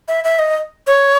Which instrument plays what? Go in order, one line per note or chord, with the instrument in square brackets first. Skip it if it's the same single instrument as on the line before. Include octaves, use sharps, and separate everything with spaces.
[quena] E5
E5
D#5
C#5